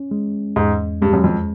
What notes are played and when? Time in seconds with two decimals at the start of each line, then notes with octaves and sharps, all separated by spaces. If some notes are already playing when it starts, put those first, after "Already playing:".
Already playing: C#4
0.11 G#3
0.56 E2 G#2
1.02 G2 G#3
1.13 F#2
1.24 F2